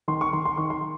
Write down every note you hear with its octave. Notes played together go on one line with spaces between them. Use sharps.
D#3 C6
C#6
D#3 C6
C6
D#3 C#6
C6